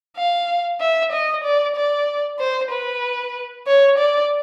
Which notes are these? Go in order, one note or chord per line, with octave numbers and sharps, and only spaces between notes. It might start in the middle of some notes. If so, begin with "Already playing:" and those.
F5
E5
D#5
D5
D5
C5
B4
C#5
D5